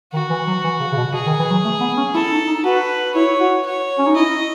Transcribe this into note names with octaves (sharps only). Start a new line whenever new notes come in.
D#3 F#4
E3
F#3
E3
C#3
C#3
B2
B2 G#4
D#3
E3
F#3
A3
B3
C#4
E4 A4
D#4
D#4
F#4 B4
E4 C#5
F#4
C#5
C#4
D#4
E4 D#5